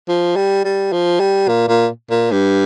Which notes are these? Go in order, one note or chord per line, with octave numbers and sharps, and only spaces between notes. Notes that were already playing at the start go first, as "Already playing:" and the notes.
F3
G3
G3
F3
G3
A#2
A#2
A#2
G2